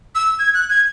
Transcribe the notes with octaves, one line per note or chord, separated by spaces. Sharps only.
E6
G#6
F#6
G#6